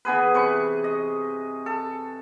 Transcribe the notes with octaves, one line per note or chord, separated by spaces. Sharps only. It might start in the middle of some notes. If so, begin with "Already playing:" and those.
E3 B3 G#4 B4
C3 B4 C#6
D#5
A4